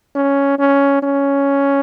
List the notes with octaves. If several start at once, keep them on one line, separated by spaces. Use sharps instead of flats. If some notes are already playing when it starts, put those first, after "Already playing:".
C#4
C#4
C#4